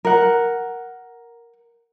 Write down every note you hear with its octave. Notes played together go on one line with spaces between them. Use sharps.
A#4 F#5